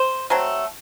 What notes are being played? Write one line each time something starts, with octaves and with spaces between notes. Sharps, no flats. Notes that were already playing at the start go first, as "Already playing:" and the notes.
Already playing: C5
F#3 A3 C4